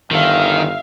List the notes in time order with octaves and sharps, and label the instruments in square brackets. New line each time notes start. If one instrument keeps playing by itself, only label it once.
[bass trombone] G1 [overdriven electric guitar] D#3 [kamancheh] E5 F5